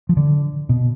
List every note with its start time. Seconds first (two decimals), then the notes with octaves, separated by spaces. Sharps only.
0.09 F3
0.17 D3
0.69 B2